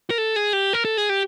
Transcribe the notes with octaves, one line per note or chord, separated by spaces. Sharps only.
A#4
A4
G#4
G4
A#4
A4
G#4
G4